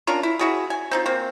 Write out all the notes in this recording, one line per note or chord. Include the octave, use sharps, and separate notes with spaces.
C#4 D4 F4 A#4
E4
E4 F#4 G#4
G#5
C4 D#4 F4
A#3 C4